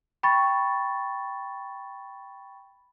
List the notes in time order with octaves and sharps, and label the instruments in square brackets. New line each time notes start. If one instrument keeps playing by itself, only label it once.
[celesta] G5 B5 C#6 A6